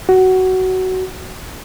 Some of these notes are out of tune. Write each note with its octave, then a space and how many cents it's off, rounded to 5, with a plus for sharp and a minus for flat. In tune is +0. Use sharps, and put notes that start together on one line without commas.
F#4 +15